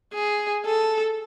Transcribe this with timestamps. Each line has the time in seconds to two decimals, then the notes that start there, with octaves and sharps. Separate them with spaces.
0.14 G#4
0.65 A4